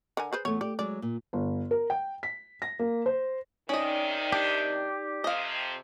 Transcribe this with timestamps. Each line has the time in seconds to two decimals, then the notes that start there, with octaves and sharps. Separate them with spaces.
0.17 D3 A#4 G#5
0.33 G#4 B4 C5
0.45 E2 A3 C#5
0.61 G4 D5
0.79 F#3 G#3 D5
1.02 A#2
1.33 G1
1.71 A#4
1.90 G5
2.23 B6
2.62 A#6
2.79 A#3
3.06 C5
3.69 C3 D#3 C#4 D#4 D5 D#5 G5
4.32 D4 G4
5.24 F2 C3 D#5 F5